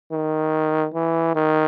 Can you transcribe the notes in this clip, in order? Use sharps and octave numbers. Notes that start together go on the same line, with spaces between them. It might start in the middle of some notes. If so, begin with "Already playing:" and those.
D#3
E3
D#3